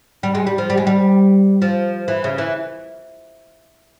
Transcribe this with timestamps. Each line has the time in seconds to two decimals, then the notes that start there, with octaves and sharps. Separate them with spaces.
0.23 G3
0.35 G#3
0.47 G3
0.58 F3
0.70 G3
0.77 G#3
0.87 G3
1.62 F3
2.08 E3
2.24 C#3
2.38 E3